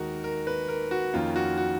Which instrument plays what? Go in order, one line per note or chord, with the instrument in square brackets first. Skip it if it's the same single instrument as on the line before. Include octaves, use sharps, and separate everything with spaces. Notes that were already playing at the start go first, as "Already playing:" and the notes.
Already playing: [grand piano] D#2 D#3 G#3 D#4 F#4 A#4
A#4
B4
A#4
F#4
F2 D#3 A#3 C#4 F4
F#4
F#4